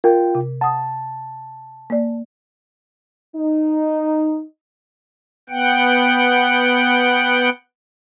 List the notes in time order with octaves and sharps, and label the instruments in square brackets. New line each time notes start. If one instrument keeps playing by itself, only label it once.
[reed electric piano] F4 G5 [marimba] A#4
[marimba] C3
[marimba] F#5 D#6 [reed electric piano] A5
[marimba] A#3 D5
[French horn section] D#4
[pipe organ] B3 F#5 G5